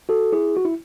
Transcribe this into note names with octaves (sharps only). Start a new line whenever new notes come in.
F#4 A4
E4 G#4
F#4
E4